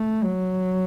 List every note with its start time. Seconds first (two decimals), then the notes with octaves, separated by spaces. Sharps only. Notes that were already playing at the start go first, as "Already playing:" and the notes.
Already playing: A3
0.23 F#3